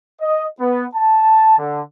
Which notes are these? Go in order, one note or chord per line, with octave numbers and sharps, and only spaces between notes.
D#5
B3
A5
D3